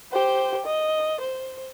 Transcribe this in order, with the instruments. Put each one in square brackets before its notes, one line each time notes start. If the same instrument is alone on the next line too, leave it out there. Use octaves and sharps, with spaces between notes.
[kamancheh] G4 C5
D#5
C5